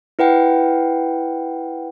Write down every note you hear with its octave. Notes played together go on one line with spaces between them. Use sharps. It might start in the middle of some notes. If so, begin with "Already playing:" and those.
E4 B4 F#5 G5